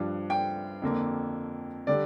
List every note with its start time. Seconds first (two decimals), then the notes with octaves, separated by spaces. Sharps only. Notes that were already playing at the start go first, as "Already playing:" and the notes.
Already playing: G2 F3 D4
0.30 G5
0.82 F2 D3 A#3
1.87 D3 G3 D5